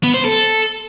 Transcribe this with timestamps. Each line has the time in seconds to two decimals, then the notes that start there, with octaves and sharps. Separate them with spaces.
0.03 B3
0.14 C5
0.25 A4